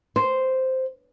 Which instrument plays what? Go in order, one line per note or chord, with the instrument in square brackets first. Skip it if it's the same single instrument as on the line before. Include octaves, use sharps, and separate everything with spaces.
[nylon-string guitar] C5